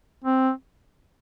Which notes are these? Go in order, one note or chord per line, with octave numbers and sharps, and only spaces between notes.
C4